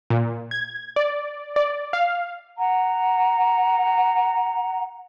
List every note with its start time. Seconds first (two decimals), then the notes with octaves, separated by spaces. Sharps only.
0.10 A#2
0.51 G#6
0.96 D5
1.56 D5
1.93 F5
2.58 F#5 A#5